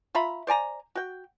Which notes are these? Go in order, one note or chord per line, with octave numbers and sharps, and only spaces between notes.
F4 E5 A#5 B5
C5 D5 G#5 A#5
F#4 G5